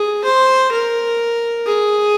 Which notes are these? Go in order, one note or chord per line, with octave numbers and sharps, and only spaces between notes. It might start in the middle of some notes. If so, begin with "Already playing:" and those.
Already playing: G#4
C5
A#4
G#4